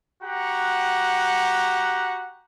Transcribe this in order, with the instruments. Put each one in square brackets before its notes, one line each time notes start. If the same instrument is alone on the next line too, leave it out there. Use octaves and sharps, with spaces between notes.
[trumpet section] F#4 G4 F#5 A#5